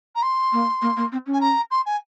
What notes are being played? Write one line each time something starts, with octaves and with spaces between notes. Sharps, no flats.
A#5
C6
A#3
A#3
A#3
C4
C#4
G#5
A#5
C6
G#5